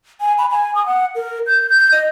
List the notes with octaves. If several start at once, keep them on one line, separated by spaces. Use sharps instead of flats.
G#5
B5
G#5
D#6
F#5
A#4
G6
G6
D#5